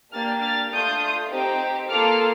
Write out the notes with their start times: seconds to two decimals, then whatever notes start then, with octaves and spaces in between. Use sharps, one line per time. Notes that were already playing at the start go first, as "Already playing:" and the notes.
0.13 A#3 D4 G4 F6 A6
0.42 F6 A6
0.71 A3 D4 F4 D#6 G6
1.31 C4 D#4 G4
1.89 A#3 F4 A4 D6 F6